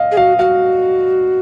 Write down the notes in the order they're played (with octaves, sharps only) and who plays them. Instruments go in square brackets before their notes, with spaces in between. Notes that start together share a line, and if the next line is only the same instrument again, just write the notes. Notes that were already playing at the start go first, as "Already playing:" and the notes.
Already playing: [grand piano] D#5 F5
[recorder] G#4
[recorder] F#4 [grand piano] F5
[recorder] F#4 [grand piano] F5